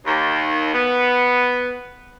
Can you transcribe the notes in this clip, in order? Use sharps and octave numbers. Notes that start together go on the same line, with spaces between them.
D#2
B3